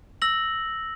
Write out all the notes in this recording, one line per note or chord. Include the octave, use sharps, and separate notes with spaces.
E6 A#6 F#7